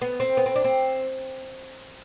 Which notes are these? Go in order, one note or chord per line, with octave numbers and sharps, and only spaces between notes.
B3
C4
B3
C4
D4
C4